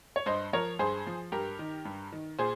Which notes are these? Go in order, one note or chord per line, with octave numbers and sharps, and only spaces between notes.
C#5
G2 C5 D#5
F3 A#4 C#5
G2 G#4 C5
F3
G2 G4 A#4
D#3
G2
D#3
A#2 G#4 C5